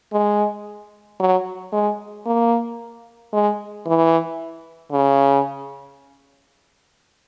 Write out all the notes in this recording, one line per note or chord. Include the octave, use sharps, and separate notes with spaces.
G#3
F#3
G#3
A#3
G#3
E3
C#3